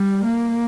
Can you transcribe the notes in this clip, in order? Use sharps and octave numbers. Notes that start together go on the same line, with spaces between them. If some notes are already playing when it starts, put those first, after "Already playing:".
Already playing: G3
A#3